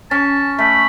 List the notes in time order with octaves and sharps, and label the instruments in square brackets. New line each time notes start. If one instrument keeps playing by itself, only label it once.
[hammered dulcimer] C#4 [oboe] A5
[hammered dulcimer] A3 [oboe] B5